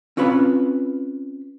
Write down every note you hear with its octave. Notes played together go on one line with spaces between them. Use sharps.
C4 C#4 F4 B4 B5